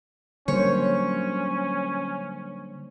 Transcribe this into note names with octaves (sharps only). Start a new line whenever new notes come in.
D3 F#3 G3 A#3 C#4 C5 C#5